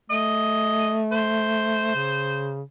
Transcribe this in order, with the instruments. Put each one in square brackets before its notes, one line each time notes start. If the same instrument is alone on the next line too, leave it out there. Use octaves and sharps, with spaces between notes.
[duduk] A3 [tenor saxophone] D#5
[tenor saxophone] C5
[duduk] C#3